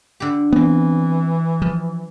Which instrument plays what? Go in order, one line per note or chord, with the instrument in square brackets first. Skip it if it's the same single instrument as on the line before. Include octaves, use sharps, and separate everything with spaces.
[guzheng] D3 G4
[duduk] E3 [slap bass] B3 C4
[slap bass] F3